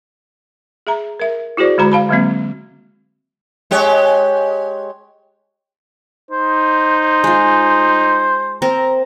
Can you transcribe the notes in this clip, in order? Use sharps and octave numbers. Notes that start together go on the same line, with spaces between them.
G#4 E5 A#5
A#4 E5
E4 F#4 G#4 C5 D5
D3 G#3 F#4 A#5 B5
F5 A5 B5
D3 F#3 G#3 A#3 C4
G#3 G4 C#5
D#4 C5
G#3 F4
C4 A#4 A#5